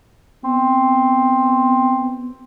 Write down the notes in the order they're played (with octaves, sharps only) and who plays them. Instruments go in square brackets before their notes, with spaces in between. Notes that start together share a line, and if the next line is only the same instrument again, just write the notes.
[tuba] B3 [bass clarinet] C4